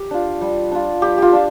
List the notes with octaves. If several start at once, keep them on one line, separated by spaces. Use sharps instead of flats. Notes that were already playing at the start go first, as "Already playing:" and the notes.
Already playing: G4
D4 F4
G3
D4 F4
G3 G4
F4 G4
D4 F4